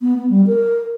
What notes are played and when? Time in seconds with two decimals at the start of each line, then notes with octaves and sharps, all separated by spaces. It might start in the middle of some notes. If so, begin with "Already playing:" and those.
0.01 B3
0.18 B3
0.30 G3
0.47 A#4